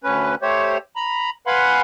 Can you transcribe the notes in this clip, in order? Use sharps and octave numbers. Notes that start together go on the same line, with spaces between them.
D2 C#4 B4
A3 G4 C5 C#5
A#5 B5
B4 F5 F#5 G#5 B5 C6